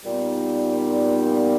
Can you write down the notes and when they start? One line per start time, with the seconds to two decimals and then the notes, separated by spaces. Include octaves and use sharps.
0.04 A#2 G3 B3 D#4